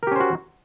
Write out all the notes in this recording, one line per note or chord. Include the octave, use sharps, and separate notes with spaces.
C#4 F#4 G4 A#4 C5